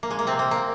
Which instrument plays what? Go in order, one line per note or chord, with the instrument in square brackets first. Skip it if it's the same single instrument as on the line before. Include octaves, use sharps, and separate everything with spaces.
[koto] A#3
G#3
A#3
C3 C4
A#3
A#3